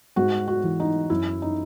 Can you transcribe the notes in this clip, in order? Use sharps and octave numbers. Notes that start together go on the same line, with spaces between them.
G#2 F#4
F#4
E3
D#4
F#2 E4
D#4